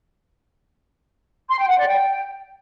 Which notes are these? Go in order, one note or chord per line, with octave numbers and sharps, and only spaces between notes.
C6
G5
F#5
D5
G5